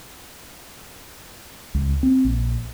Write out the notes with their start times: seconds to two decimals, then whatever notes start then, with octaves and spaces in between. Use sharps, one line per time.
1.75 C#2
2.03 C4
2.25 A#1